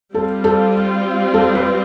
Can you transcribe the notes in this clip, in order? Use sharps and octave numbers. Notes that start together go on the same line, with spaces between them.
G3 C4 F4 A4
A4
A4
B4